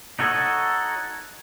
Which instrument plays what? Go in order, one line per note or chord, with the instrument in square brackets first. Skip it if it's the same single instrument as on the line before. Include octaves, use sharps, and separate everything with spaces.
[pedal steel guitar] D#4 F#4 A4 C#5